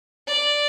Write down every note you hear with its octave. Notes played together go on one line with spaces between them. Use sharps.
D5